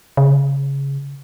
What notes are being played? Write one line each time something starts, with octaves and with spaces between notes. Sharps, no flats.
C#3